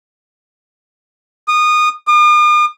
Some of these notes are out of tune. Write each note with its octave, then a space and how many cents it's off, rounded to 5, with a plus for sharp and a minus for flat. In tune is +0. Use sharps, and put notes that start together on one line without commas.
D#6 -20
D#6 -45